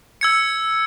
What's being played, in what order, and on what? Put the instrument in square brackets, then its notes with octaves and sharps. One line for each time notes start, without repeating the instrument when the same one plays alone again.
[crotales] E6 G#6 C#7